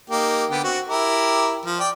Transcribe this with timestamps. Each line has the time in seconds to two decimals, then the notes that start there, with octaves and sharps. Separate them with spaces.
0.10 A#3 D#4 G4
0.50 D3 B3 G5
0.64 C4 F#4
0.88 E4 G4 A#4
1.66 F3
1.80 D5 G5